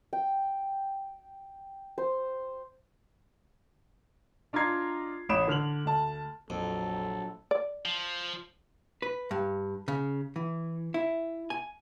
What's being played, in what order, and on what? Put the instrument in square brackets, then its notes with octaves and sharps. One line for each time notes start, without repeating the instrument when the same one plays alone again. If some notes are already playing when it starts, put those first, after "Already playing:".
[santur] G5
C5
[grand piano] D4 F4 D#5 A#5 G#6 C7
A1 C#5 B5 D#6 D7 E7
D3 F6 F7 F#7
D2 A5
[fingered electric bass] A#1 [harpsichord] F2 [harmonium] F#3 [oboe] A4
[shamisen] D5
[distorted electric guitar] F3
[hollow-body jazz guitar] B4
G2
C#3
E3
E4
G#5